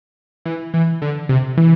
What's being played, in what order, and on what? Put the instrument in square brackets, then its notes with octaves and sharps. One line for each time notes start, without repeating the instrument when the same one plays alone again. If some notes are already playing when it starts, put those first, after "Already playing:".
[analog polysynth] E3
E3
D3
C3
E3